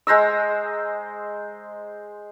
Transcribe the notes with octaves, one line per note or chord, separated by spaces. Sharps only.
G#3 C5 A#5 E6